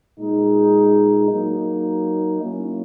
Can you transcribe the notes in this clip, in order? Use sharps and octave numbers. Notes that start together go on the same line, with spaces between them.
A#2 G#3 D#4
F#3 A#3 D#4
F#3 A#3 C#4 E4